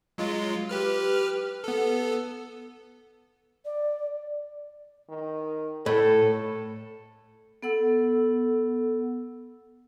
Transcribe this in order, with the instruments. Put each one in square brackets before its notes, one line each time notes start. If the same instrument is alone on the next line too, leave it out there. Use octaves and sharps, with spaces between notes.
[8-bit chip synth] F#3 G#3 F4
G4 B4 F6
B3 A4
[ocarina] D5
[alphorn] D#3
[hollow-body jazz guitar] A2 B5 [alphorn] A4
[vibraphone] B3 A4 F#5 E6